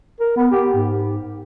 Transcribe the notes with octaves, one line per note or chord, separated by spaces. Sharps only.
A#4
B3
G4
G#2